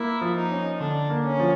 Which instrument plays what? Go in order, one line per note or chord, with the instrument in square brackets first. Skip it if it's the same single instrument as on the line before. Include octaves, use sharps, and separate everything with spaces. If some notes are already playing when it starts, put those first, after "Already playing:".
Already playing: [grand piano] A#3 [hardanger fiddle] E4
[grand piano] F3
[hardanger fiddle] D#4
[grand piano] C#4
[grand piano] D3 [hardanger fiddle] D4
[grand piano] A#3
[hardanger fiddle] C#4
[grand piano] F3